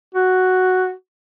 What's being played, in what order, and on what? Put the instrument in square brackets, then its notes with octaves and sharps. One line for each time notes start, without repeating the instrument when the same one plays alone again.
[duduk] F#4